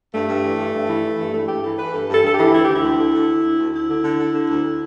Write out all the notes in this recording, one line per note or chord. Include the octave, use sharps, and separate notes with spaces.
G2 A3
G2
E3
G2
G2
E3
E3
G2
E3 A3
G2 G4
E3 A4
E3 B4
G2 A4
G2 A4
G2 A4
E3 G4
D2 E4
D3 G4
E4
D2
D3
D3
D3
D2
D2
D2 E4
D3
D3
D3
D3
D2